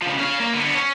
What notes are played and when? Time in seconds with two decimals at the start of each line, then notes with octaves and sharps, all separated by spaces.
0.02 C#3 F3
0.19 C#4 F5
0.40 A#3
0.53 D3 B3
0.75 C#4